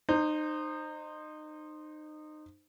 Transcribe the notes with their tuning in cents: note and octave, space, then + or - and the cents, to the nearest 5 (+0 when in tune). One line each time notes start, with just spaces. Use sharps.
D#4 -25 C5 +5